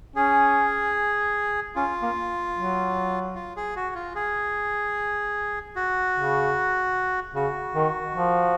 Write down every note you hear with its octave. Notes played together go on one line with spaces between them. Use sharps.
C#4 G#4
C#4 F4
A#3
F#3
F4
G#4
F#4
F4
G#4
F#4
C#3
C#3 F#4
D#3
F3